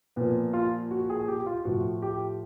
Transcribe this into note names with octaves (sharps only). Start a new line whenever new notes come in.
A#2 F3 B3
F4
F#4
G#4
G4
F4
A2 F3 F#4
G4